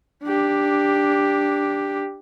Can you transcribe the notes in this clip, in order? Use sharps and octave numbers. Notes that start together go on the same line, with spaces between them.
D4 G4